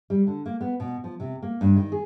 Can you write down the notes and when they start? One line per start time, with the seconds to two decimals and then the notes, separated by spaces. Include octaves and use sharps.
0.10 G3
0.27 D3
0.46 A#3
0.61 B3
0.80 B2
1.04 F3
1.20 C3
1.42 A#3
1.61 G2
1.77 D#3
1.92 G#4